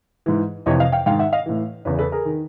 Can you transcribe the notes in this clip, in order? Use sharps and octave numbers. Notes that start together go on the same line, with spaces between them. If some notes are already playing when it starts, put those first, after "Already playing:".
G#2 E3
F2 C3 E3 C#5 D#5
D#5 F5
F5 G5
G#2 D#3 F5 G5
E5 F#5
D#5 F5
A2 E3
E2 C#3 E3 B4 C#5
A4 B4
G#4 A#4
D#3